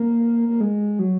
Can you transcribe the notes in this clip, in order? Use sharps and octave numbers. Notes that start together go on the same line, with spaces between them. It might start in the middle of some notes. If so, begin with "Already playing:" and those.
Already playing: A#3
A#3
G#3
F#3